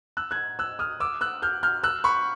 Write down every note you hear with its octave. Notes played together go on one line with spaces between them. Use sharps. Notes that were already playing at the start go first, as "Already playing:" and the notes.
E6 F#6
F#6 G#6
E6 F#6
D#6 F6
D6 E6
E6 F#6
F6 G6
F6 G6
E6 F#6
B5 C#6